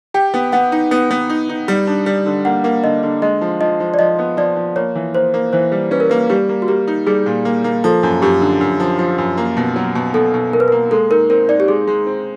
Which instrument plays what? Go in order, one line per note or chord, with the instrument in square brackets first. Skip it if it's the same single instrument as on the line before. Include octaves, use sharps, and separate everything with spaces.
[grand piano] G4 [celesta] G5
[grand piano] B3
[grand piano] B3 [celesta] F#5
[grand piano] D#4
B3
B3
D#4
D#4
G3
D4
G3
D3
[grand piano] A#3 [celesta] F#5
[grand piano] A#3
[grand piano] D3 [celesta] D#5
[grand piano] D3
[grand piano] G#3 [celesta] D#5
[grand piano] F3
[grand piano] F3 [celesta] D#5
[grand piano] F3
[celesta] D5
[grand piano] F3 [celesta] D#5
[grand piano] B3
[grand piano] F3 [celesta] D5
[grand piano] F3
[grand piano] A#3 [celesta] C#5
[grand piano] E3
[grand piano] A#3 [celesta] C5
[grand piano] A#3
[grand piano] E3 [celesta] C5
[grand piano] G3
[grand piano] C#4 [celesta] B4
[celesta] A#4
[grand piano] A#3 [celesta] B4
[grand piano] G3 [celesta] G4
[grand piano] A#3
[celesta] F#4
[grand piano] A#3 [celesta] G4
[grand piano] D#4
[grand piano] G3 [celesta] G#4
[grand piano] A#2
A#3
A#3
[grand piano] F3 [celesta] A4
[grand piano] F#2
[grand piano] F#2 [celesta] G4
[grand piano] D3
F#2
F3
F3
F#2
A#3
B2
F#3
B2
[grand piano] B2 [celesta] A4
[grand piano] B2
[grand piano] B2 [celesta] A#4
[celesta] B4
[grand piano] A#3 [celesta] A#4
[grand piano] G#3 [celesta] A4
[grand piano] D#4 [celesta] A#4
[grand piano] C4 [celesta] A#4
[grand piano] D#4 [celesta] D5
[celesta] G4
[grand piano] G#3 [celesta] G#4
[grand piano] G#3
C4